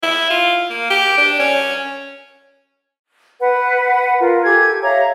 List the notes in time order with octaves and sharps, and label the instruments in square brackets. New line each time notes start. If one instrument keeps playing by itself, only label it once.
[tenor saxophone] E4
F4
A#3
G4
D4
C#4
[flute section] B4 F#5
F4 A#4
G4 A4 G#5 G#6
C#5 E5 F5 A#5